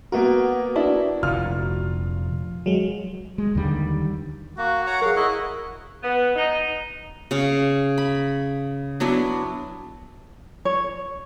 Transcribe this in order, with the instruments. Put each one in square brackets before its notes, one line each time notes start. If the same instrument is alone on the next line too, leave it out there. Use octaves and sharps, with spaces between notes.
[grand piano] A#3 B3 A#4 [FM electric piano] F#4
[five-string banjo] D4 E4
[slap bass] F1 A#2 [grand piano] F4 F6
[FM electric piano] F#3 G#3
[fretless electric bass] G#3
D#2 D3 D#3 G3
[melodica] A#3 [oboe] F#4
[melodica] C#5 F#5 A#5
[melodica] F#3 F5 [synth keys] G#4 A#4 [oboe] F#5
[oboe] E4 [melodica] F#4 D#5
[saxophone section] B3
D#4
[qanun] C#3 F5
B5
F#3 B3 D4 E4
[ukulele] C#5